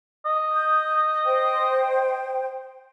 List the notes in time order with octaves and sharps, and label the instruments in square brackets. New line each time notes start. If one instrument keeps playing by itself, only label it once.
[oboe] D#5
[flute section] D#6 G6
C5 G5